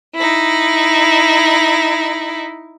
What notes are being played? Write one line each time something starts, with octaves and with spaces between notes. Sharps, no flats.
D#4 E4